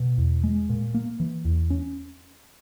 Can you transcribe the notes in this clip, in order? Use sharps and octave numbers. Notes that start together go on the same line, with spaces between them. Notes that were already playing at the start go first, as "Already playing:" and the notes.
Already playing: B2
E2
G#3
A#2
A#3
E3
E2
C#4